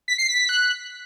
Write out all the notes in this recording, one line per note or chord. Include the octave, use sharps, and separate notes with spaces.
B6
C7
B6
B6
F#6